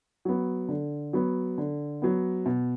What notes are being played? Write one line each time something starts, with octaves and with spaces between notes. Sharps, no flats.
F#3 B3
D3
F#3 B3
D3
F#3 B3
B2